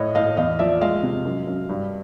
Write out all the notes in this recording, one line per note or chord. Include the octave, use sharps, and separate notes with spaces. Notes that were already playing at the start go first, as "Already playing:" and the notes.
Already playing: A2 C#5 D#5
A2 D#5 F5
E2 D#5 F5
F3 D5 E5
G#3 D#5 F5
C3
F#2
F#2
G2